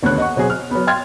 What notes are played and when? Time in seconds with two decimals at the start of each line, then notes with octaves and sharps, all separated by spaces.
0.03 D#1 D2 B3 C#5 F#6
0.18 D#5 F#5 C#6
0.36 B2 F#3 C4 F#4 G#4
0.50 F6
0.71 F#3 B3
0.87 G5 C6 F6 G#6 A6